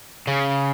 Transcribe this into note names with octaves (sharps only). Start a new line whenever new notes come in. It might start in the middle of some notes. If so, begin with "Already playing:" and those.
C#3